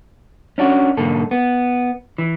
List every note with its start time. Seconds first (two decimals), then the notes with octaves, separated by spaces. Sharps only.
0.58 C#4 D4 F#4
0.97 B1 G#2 D3 A#3 A4
1.31 B3
2.18 E3